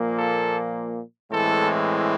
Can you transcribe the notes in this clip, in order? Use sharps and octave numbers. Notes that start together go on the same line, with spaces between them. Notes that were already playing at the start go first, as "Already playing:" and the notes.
Already playing: A#2 F3 A#3
A4
A2 E3 G#3 C4 A4